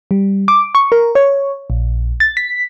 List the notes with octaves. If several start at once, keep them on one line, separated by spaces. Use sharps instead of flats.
G3
D6
C#6
A#4
C#5
A#1
A6
B6